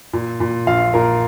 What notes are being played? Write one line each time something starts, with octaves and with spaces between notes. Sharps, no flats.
A#2
A#2
A#1 F5
A#2 A#4